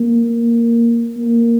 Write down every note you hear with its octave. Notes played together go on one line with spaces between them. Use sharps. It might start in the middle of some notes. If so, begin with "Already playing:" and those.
Already playing: A#3
A#3